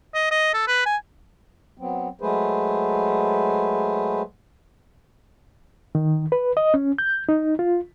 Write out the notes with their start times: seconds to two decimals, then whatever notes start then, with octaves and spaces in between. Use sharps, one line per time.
0.15 D#5
0.32 D#5
0.54 A4
0.68 B4
0.86 G#5
1.77 F#3 B3 C4
2.21 F#3 G#3 A3 G#4 B4 C5
5.95 D#3
6.32 B4
6.57 D#5
6.74 C#4
6.98 G6
7.29 D#4
7.59 F4